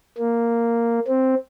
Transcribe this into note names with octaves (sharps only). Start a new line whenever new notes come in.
A#3
C4